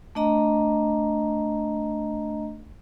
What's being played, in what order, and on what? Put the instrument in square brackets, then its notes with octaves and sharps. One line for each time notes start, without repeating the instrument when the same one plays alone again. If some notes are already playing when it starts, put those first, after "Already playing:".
[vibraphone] A3 D4 D#5 A#5